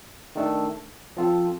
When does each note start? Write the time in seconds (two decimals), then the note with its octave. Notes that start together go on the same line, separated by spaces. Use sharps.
0.35 D#3 A3 D4 A4
1.17 F3 C4 F4 A4